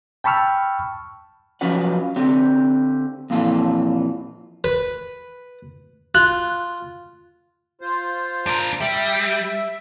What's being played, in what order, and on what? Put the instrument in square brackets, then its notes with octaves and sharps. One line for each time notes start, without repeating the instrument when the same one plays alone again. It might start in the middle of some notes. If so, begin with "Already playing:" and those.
[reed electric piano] G5 A5 B5 C#6 E6 F6
[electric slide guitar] F3 F#3 C#4 F4 B4 F#5
D3 C4 G4
F2 A#2 E3 F4 A4
[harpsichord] B4
[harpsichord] F4 [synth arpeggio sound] F#6
[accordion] F4 C5
[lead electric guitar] D4 A#4
[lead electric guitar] G3 [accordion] E5